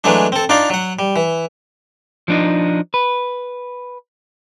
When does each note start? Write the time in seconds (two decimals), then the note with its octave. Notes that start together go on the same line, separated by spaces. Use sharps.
0.04 E3 F#3 G#3 A3 D4
0.32 C4 A4
0.49 D4 D#4 F4 D5 F5
0.70 F#3 F#5
0.99 G3
1.16 E3
2.28 F3 D4 D#4
2.94 B4